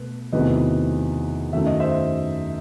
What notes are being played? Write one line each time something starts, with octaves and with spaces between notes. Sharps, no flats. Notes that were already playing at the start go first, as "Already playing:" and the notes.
Already playing: B2 A3 B4
E2 C3 D#3 F#3 A3 B4 D#5
F#2 D#3 F#3 A3 E5
D#5
C5 E5